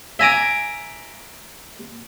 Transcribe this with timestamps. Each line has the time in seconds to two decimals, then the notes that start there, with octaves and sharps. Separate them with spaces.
0.19 E5 G#5 A#5 D6